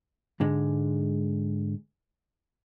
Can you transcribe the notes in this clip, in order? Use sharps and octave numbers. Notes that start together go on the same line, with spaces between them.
G#2 D3 G#3